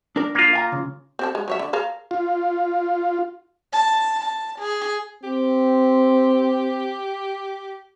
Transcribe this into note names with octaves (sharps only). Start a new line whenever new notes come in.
D4 A#4
A#3 F4
F5 G#5 A#5
C#3
C4 G4 A4
G#3
F#3 C#5 E5
D3
G#4 A#4 F5
F4
A5
A5
G#4
C4 G4